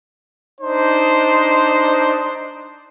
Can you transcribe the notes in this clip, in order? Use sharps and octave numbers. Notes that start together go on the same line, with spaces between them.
D4 D#4 C5